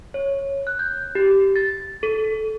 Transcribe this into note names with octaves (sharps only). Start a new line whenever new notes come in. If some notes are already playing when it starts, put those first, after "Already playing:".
C#5
F#6
G6
G4
A6
A4